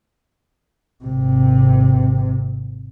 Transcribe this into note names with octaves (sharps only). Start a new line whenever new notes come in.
G#1 C3